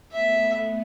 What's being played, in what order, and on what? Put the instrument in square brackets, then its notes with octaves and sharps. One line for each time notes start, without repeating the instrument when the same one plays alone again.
[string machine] A3 B3 [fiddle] E5